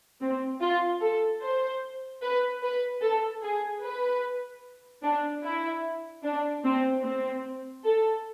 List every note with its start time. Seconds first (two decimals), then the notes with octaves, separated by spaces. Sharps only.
0.21 C4
0.61 F4
1.01 A4
1.42 C5
2.22 B4
2.62 B4
3.02 A4
3.43 G#4
3.82 B4
5.02 D4
5.43 E4
6.24 D4
6.64 C4
7.03 C4
7.84 A4